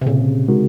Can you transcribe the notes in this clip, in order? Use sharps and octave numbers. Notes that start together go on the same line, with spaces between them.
C3
A#2 C#3
G#3 D#4 F#4 A#4